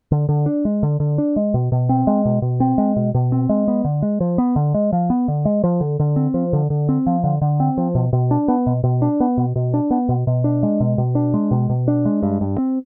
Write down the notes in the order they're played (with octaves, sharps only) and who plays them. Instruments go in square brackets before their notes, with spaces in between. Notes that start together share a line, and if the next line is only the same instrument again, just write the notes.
[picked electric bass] D3
D3
D4
G#3
D3
D3
D4
G#3
B2
B2
C4
G#3
B2
B2
C4
G#3
B2
B2
C4
G#3
B3
D3
G#3
F3
B3
D3
G#3
F3
B3
D3
G#3
F3
D3
D3
C4
F3
D3
D3
C4
F3
D3
D3
C4
F3
B2
B2
D4
B3
B2
B2
D4
B3
B2
B2
D4
B3
B2
B2
D4
G#3
B2
B2
D4
G#3
B2
B2
D4
G#3
G2
G2
C4